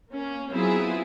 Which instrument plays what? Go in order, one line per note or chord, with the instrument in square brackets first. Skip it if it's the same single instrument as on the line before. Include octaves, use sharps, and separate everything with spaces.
[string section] A#3 C#4
F#3 B3 C4 E4 F4 G#4